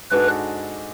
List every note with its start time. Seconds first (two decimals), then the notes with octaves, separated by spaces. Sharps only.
0.11 G#2 G#3 D4 F#4 A4 B4